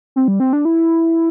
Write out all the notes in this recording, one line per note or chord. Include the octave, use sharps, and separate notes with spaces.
C4
G3
C4
D4
E4